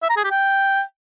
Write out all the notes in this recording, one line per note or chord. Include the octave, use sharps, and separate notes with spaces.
E5
A#5
G#4
G4
G5